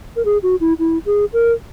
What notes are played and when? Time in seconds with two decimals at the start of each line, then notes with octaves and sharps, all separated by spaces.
0.16 A#4
0.25 G#4
0.43 F#4
0.60 E4
0.79 E4
1.06 G#4
1.33 A#4